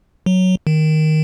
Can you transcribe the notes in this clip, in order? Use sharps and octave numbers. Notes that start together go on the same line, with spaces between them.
F#3
D#3